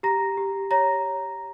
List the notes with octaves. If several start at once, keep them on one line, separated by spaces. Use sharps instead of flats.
G4 A#5 A#6
G4
C#5 A#5 A#6